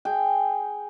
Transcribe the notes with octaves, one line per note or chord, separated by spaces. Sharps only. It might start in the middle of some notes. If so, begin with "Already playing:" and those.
G#4 G5